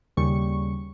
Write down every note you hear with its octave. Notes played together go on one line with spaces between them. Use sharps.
D#2 C#3 G3 C#6